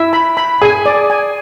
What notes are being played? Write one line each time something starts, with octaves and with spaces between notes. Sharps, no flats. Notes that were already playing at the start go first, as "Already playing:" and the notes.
Already playing: E4 E5
B5
B5
G#4 G#5
D5
G#5